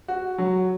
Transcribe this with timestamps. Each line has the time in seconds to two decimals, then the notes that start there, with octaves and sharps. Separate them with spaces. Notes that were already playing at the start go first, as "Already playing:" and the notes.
0.08 F#4
0.38 F#3